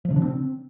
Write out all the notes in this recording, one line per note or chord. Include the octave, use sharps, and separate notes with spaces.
F3
C#3
D4
C4